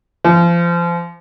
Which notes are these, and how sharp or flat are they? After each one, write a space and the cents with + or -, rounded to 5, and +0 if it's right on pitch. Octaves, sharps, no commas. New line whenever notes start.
F3 -30